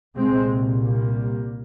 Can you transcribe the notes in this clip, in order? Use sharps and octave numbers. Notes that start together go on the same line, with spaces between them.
C2 A#2 G#3 C4
G3 A#3